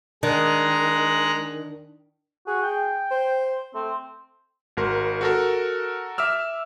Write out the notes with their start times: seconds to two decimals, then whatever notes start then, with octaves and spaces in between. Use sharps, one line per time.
0.23 D#3 G#3 D4 A#5 F#6
2.47 F#4 G#4
2.62 G5
3.11 C5
3.75 A3 C4
4.77 G#1 F#4 A#4 C6
5.21 F#4 A4 A#4
6.18 E5 D6 E6 F6